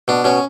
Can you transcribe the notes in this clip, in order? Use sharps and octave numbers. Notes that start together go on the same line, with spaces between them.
B2 D4
B2 C#4